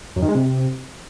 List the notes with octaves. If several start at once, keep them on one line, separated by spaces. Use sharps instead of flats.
F#2
D#3
G#3
C3